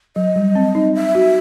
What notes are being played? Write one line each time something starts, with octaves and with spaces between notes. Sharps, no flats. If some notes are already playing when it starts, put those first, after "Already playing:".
F#3 D#5
G3
C4
D#4
E5
F#4